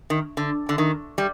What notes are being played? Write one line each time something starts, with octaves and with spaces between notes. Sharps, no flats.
D#3
D3
D3
D#3
G3